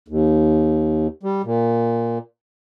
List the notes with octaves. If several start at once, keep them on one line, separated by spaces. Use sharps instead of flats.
D#2
G3
A#2